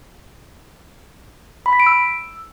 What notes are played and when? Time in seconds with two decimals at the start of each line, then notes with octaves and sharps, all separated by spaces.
1.66 B5
1.73 B6
1.80 D7
1.86 E6